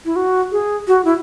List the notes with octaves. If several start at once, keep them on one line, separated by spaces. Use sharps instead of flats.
E4
F#4
G#4
F#4
E4